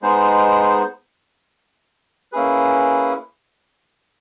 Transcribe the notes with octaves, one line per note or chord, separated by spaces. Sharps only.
G#3 B3 D#4 G#4 C5
A#3 C#4 E4 G#4 B4